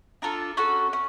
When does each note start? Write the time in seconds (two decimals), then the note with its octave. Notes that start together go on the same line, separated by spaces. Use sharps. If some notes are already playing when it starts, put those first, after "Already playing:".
0.22 D4 F4 A4 A#5
0.57 C#4 F#4 A4
0.93 C#4